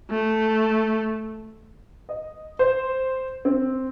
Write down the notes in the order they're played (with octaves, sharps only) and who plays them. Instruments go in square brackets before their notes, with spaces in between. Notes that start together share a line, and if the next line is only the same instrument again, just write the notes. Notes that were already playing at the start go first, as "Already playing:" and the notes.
[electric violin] A3
[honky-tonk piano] D#5
C5
C4